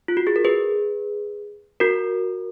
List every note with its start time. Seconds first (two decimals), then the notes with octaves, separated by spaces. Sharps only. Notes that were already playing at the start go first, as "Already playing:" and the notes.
0.08 F4
0.17 F#4
0.27 G#4
0.36 A#4
0.45 G#4 B4
1.80 F#4 A#4